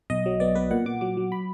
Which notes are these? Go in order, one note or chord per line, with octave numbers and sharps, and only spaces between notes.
B1 D#5
F#3
B3 D5
B3 B4
A#2 F#5
A#2 D6
F#3 D6
F#3
B5